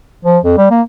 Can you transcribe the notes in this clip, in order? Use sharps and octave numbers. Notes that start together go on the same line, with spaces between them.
F3
F2
G3
A#3